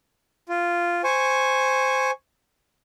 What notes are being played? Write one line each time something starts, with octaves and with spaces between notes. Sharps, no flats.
F4
C5 G#5 C#6